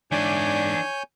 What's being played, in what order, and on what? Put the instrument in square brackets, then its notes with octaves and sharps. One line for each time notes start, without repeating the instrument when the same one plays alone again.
[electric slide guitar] G#2 [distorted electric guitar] E3 D5 [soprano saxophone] D4 [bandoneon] C#5 G#5 G6